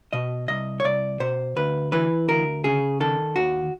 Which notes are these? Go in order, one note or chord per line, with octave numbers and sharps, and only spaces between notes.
B2 D#5
C2 D#5
C#5
C2 D5
B2 C5
D2 B4
E3 B4
D2 A#4
C#3 G#4
D#3 A4
D#2 F#4